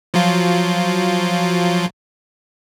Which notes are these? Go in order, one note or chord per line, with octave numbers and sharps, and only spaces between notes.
F3 F#3 F4